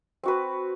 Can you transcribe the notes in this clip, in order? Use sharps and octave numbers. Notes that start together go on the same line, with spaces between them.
C4 F#4 B4